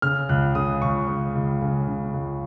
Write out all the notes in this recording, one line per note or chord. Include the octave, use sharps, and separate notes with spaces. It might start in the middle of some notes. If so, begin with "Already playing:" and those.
C#3 F6
C#2 F#6
C#3 D#6
C#2 C#6
C#3
C#2
C#3
C#3
C#2